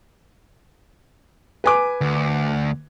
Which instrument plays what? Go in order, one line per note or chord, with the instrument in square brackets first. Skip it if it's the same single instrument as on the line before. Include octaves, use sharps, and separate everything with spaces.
[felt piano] B4 G#5 D6
[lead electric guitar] D2